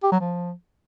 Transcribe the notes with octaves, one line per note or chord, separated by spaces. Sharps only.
G4
F#3
F3